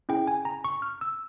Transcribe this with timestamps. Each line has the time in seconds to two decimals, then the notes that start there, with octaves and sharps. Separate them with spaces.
0.09 C#4 E4 G#4 G5
0.27 G#5
0.45 A#5
0.64 C#6
0.82 F6
1.01 E6